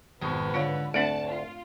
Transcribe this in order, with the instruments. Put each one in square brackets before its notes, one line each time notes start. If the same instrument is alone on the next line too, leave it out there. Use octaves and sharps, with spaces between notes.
[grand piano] G#1 B2 [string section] F2 G#2 B4
[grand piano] D3 [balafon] F4 C#5 F5
[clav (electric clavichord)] D2 F#5 [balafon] A3 C4 D4 [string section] A5 [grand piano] D7
[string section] F4